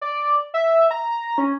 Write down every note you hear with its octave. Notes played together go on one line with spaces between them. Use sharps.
D5
E5
A#5
C#4